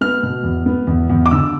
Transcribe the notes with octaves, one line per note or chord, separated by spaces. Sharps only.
B3 F6
B2
E2
B3
E2
E2
D6
D3 E6